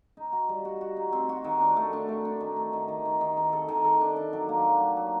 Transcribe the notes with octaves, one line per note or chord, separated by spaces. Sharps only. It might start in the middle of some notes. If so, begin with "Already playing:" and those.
D#4
F#4
G3
F#4
F#4
D#4
C4
F#4
D#3
D4
A3
D4
A3
D4
D#3
D#3
D#3
D#3
D#3
D#3
D#3
A4
D#3
A4
D4
D4
F#3
A#3
F#3
F#3
F#3